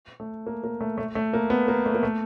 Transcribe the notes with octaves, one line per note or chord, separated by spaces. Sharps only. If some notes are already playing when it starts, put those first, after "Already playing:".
A3
A#3
A#3
A3
A3
A3
A#3
B3
A#3
A3
A#3
A3